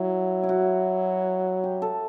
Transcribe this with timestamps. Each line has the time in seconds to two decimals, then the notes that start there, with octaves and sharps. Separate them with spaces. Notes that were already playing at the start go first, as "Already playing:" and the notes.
Already playing: F#3 E4
0.43 E4
0.49 F#4
1.64 G4
1.82 A4